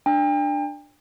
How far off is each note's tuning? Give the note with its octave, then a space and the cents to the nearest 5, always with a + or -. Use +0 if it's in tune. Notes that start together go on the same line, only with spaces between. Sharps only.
D4 +15 G5 +40